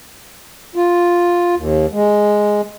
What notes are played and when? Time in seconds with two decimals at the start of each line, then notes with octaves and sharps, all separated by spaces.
0.76 F4
1.56 D#2
1.92 G#3